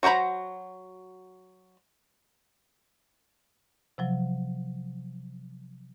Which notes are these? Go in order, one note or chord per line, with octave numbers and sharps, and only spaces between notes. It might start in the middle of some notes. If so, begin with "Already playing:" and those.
F#3 F#4 C5 A#5 B5
C3 F3 F#3